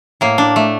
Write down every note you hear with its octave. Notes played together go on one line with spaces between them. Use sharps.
A2 A#3
D4
A3